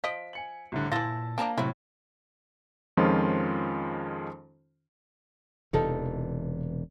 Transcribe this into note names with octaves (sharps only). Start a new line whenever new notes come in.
F3 D#5 B6 D7
G#5 C#7 F#7
C2 A2 D3
A#2 E3 E4 F4 A5 A6 A#6
F3 A#3 D4 G5 A5 A#5
A2 C3 F#3 E4
F2 D#3 F3 G#3 C#4 F4
E1 C3 E3 D#4 F4 A4